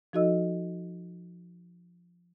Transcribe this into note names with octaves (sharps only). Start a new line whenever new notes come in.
F3 D#4 F#4 A4 D#5 E6